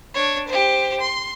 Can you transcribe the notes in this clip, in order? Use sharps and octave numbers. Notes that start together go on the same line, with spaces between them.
D4 C#5
G4 C5
C6